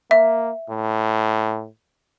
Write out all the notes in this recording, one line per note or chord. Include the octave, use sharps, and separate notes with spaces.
A#3 E5
A2